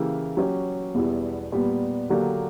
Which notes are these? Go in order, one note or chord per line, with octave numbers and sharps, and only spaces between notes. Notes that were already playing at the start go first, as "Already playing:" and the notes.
Already playing: C#3 E3 A#3 E4 G4
F#3 C#4 G4 C#5
E2 B2 G3 B3 E4
A#2 G3 B3
D3 F#3 A#3 D4 G4